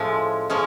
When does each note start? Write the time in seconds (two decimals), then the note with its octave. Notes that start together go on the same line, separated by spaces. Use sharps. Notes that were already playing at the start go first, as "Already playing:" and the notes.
Already playing: A2 F3 G#3 C#4
0.50 F3 G#3 C#4